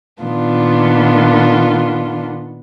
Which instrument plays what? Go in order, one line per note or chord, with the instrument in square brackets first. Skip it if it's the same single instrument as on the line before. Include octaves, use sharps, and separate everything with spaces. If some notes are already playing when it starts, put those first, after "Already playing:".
[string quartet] A#2 D#3 B3 D4 F4